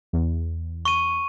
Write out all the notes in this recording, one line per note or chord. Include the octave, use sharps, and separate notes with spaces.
E2
C#6 D#7